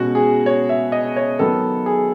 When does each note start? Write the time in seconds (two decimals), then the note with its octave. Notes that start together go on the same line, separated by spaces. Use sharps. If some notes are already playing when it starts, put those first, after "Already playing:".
Already playing: B2 G#3 C#4 F#4
0.15 G#4
0.46 C#5
0.69 E5
0.92 D#5
1.16 C#5
1.39 D#3 F#3 B3 A4
1.86 G#4